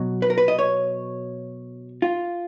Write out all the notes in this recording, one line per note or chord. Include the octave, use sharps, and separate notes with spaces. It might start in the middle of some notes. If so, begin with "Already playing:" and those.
Already playing: B2 F#3
B4
A#4
B4
D#5
C#5
F4